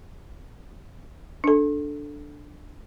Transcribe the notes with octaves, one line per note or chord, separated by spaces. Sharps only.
D4 A4